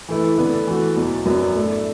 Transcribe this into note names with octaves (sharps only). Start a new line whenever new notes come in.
E3 A3 E4 B4
D3 B3 D4 B4
E3 A3 F#4
E2 B2 F#3
F#2 F#3 B3 D4
A2 A3 D4